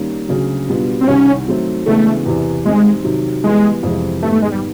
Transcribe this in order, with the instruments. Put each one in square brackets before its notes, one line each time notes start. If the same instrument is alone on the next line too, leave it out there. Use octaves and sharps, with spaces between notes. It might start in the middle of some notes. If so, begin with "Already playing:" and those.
Already playing: [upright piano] D#3 G3 A#3 C#4
D2 C#3 F#3
B2 G3 B3 D4 F4
[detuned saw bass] C4
[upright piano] C2 C3 D#3 G3 [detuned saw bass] C#4
[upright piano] D#3 F#3 A3 C4
[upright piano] C#3 E3 G#3 B3 D4 [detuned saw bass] A3
[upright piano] E2 C3 E3
[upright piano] D#3 G3 C4 [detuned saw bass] G#3
[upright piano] C3 D#3 F#3
[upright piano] E3 G3 B3 [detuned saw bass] G#3
[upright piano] F2 C3 E3 G#3
[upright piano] G#2 D#3 G3 B3 [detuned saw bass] A3
[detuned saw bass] A3
G#3
G3